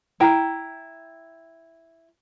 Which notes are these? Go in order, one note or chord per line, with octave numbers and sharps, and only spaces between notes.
E4 G5 A#5